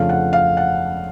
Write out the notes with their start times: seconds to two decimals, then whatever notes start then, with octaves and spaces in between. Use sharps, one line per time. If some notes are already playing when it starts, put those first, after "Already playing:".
Already playing: F2 C#3 F3 A3 D4 F5
0.09 F#5
0.33 F5
0.57 F#5